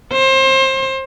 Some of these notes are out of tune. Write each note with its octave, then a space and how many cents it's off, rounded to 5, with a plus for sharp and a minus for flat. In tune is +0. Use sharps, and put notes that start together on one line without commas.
C5 +25